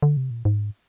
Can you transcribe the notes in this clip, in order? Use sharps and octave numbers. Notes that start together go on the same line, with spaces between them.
D3
C3
A#2
G#2